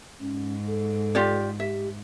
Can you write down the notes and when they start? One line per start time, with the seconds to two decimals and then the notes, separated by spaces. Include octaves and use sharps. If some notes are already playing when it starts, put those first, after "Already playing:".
0.20 G#2 C#4
0.67 A4
1.15 F4 G4 D5
1.60 G4 E5